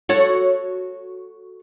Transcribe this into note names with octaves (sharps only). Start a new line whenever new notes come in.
F#4 A4 C#5